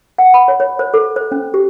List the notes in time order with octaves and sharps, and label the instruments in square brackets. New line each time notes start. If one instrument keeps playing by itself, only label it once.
[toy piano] F#5
B5
C#5
C#5
C5
A4
C5
C#4
G4